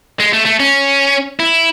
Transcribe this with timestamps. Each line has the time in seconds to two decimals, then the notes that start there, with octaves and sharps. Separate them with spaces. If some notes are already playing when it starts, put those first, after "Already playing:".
0.20 G#3
0.33 A3
0.46 A3
0.60 C#4
1.40 E4